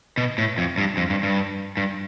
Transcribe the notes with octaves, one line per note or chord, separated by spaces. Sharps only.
B2
A2
F2
G2
F2
G2
G2
G2